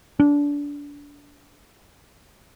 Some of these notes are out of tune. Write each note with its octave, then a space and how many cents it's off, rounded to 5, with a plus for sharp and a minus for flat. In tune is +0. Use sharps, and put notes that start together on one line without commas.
D4 -25